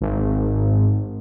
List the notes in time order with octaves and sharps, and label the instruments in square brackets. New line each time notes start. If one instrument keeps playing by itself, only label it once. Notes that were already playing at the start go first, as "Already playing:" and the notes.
[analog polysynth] G#1